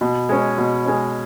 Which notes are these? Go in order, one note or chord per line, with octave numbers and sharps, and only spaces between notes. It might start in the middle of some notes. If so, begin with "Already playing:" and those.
B2
G#3 C#4
B2
G#3 C#4